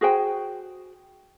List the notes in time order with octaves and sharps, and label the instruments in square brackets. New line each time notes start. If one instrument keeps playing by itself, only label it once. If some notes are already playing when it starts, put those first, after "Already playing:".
[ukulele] F#4 G#4 C5 G5